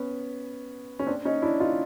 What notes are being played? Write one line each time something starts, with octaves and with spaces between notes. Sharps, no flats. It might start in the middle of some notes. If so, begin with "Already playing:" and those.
Already playing: B3 C#4
C#4
C4 D4
C#4 D#4
D4 E4
D#4 F4